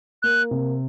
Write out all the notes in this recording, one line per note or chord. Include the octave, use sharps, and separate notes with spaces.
A#3 F#6
C3